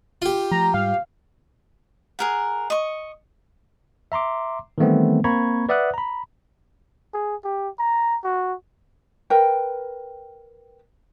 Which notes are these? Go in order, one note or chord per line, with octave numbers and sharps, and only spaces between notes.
F4 G4
F3 A3 A#5
G#2 G3 F5
G#4 A#4 F#5
D#5 C#6
E5 A#5 C6 D6
D#3 E3 G3 A3 B3 C4
A#3 C4 A#5 B5 C#6 G#6
B4 D5 E5 F#5 D#6 F#6
A#5 B5
G#4
G4
A#5
F#4
A#4 B4 G5